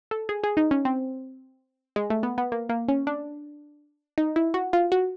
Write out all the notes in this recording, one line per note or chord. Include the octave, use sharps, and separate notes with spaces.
A4
G#4
G#4
D#4
C#4
C4
G#3
A3
B3
B3
A#3
A#3
C#4
D4
D#4
E4
F#4
F4
F#4